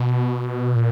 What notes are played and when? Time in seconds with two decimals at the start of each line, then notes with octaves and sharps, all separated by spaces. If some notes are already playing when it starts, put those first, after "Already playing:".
Already playing: B2
0.75 A#2